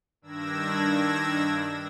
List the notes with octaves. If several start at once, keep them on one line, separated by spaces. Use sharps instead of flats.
G2 D#3 D4 E6 G#6 A#6